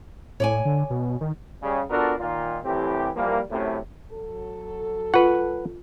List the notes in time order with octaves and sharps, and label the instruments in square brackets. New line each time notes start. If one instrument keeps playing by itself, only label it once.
[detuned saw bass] A2 [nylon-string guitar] C#5 D5 G#5
[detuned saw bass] D3
B2
D#3
[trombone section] C#3 G3
B3 D4 F4 F#4 A4 A#4
A#2 D#3 F4
C2 A2 E3 C4 G4
E3 F3 G3 A#3
F#2 A2 C3
[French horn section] F#3 A4
[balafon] F4 [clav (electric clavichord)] B4 F#5